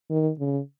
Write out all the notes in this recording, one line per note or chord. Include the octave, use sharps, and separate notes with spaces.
D#3
C#3